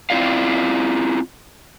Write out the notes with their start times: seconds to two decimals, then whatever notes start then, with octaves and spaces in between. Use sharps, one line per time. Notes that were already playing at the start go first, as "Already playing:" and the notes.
0.10 C4 E4 F4 D5 F5